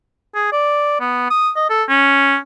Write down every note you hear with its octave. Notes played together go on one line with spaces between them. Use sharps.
G#4
D5
B3
D#6
D#5
A4
C#4